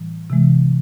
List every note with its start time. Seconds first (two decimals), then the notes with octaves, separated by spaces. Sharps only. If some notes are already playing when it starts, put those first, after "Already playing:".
Already playing: A2 E3 G3
0.30 C3 E3 G#3